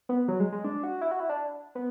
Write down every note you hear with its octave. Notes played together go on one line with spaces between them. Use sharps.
B3
F#3
G#3
G#3
D4
F#4
E4
F#4
E4
D4
B3